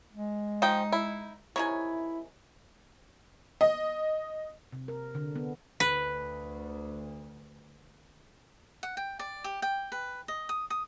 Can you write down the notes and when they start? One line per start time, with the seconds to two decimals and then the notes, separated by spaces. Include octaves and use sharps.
0.13 G#3
0.62 F3 D#4 G5
0.92 E4
1.56 C3 D#3 E4 C#5 G#5
3.61 D#5
4.72 C3
4.88 A#4
5.15 D3
5.36 B3
5.80 D2 B4
8.83 F#5
8.97 G5
9.19 D5
9.44 G4
9.62 G5
9.92 B4
10.28 D#5
10.49 D#6
10.70 D#6